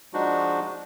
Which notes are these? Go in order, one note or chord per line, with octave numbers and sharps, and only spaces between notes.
F3 G#3 D4 D#4 F#4